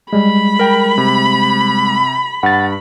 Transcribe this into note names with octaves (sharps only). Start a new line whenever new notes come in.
G3 G#3 B5
A#4 G5
C3
G2 F#5 A6